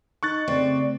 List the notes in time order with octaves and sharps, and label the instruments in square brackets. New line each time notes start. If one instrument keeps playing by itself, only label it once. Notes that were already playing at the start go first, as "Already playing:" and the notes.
[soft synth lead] D#4 [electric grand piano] C#6 F#6 A6
[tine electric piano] C#3 A3 [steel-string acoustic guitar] C4 [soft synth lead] D5